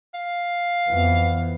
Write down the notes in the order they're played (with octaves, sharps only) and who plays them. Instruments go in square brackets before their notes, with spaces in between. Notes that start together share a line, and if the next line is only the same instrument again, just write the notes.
[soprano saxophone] F5
[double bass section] F2 E3 B3